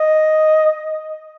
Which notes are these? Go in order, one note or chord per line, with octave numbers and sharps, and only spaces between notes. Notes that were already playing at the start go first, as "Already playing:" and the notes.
Already playing: D#5